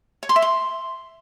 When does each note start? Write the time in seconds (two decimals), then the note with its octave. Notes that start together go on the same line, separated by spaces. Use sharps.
0.23 C#5
0.29 C6
0.36 E5
0.42 C6